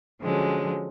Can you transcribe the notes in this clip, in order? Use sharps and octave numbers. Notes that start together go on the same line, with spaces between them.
D3 F3 F#3 G#3 C#4